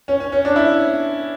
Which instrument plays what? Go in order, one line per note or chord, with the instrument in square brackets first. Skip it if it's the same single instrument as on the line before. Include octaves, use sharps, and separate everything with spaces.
[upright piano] C#4
C#4
C#4
D4
E4